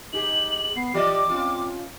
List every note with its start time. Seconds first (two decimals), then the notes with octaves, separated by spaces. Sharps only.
0.13 D#4 G4 G#4 F#7
0.76 B3 C7
0.94 E3 G4 D5 D#5 D6
1.30 C4 C#4 F4